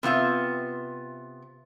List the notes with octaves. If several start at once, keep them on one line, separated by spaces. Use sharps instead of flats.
C3 B3 F4 E5